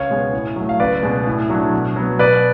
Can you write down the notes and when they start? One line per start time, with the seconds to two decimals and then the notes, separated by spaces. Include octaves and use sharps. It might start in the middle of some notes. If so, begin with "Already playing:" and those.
Already playing: C#2 C#5 F5
0.10 B2 G#3 B3
0.33 A2
0.56 F#3 A3
0.69 F5
0.80 C#2 B4 D5
1.03 B2 G#3
1.27 A2
1.50 F#3 A3 D4
1.73 B2
1.96 F#3 B3
2.19 B2 B4 D5